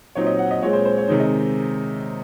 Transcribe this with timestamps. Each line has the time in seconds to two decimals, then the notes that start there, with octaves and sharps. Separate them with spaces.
0.15 A#2 F#3 C4 D#4 C#5
0.27 D#5
0.39 F#5
0.51 D#5
0.62 A#2 G#3 C4 C#5
0.73 C5
0.85 C5
0.98 C#5
1.08 C3 D#3 G#3 D#4
1.20 D#5